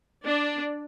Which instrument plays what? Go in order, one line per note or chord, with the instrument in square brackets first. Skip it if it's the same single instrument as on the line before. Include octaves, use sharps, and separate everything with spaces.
[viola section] D4